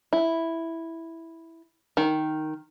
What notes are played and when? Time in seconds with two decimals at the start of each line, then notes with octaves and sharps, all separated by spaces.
0.13 E4
1.97 D#3